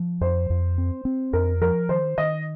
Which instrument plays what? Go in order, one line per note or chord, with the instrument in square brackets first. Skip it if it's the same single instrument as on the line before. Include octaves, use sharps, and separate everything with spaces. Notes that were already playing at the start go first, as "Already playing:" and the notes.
Already playing: [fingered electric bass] F3
[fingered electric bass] F2 [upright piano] C5
[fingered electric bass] F2
C4
C4
[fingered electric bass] F2 [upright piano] A#4
[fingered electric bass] F3 [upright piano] A#4
[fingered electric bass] D#3 [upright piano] C5
[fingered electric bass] D#3 [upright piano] D#5